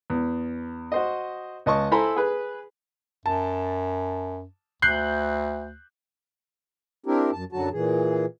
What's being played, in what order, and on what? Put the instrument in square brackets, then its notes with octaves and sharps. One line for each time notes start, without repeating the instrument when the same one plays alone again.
[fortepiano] E2
F#4 C5 D#5
C#2 D#5 A5 C#6
E4 A4 C5 G#5 A#5 B5
G#4 B4
[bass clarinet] F#2 [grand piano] A5
[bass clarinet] D2 [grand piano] F#6 G6 C7
[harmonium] C4 D4 E4 G4 A#4
F#2 A5
F#2 D3 F#3 F#4 A5
A#2 E3 G#4